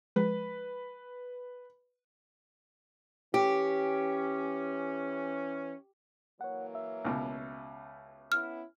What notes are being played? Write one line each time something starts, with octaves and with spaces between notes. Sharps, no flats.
F3 G#3 B4
E3 C#4 G4
E3 F#3 A#3 C#5 F#5
E5
C#2 B2
B3 C#4 E4 F6